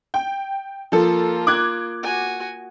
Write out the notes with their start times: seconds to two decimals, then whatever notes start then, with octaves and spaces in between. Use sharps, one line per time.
0.14 G5
0.92 F3 A#3 F4 A4
1.47 D6 F#6 G#6
2.03 F#4 G#5